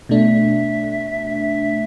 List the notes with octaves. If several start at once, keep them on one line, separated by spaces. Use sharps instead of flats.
B2 A3 D4 E5